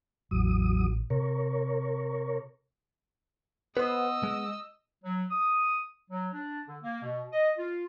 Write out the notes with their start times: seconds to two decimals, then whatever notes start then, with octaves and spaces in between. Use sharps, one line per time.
0.31 A1 E2 F#3 D#6
1.10 C3 A#4 C#5
3.77 B3 B4 C5 D#5 E6
4.23 G#3
5.03 F#3
5.31 D#6
6.10 F#3
6.33 D4
6.67 D3
6.83 A#3
7.03 B2
7.32 D#5
7.58 F4